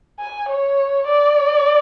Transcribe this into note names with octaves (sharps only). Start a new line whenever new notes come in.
G#5
C#5
D5